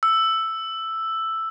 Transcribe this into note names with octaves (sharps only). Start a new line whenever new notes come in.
E6